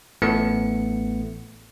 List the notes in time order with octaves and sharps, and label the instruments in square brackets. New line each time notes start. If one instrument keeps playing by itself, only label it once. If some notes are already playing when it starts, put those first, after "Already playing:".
[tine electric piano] A1 A2 A3 B3 C#7